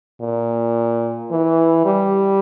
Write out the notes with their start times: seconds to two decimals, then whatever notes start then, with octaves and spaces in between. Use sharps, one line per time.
0.21 A#2
1.31 E3
1.85 G3